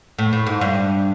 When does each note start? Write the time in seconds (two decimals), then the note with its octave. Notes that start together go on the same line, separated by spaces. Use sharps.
0.19 A2
0.33 A2
0.47 G#2
0.61 G2